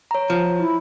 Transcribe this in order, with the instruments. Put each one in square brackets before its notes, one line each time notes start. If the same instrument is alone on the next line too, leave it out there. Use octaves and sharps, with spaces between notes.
[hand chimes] C#5 A#5
[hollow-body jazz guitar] F3
[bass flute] E4